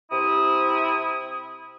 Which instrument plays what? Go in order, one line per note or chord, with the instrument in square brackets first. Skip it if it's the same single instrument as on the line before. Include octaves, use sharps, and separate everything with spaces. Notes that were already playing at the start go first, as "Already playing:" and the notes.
[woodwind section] C3 E4 D#6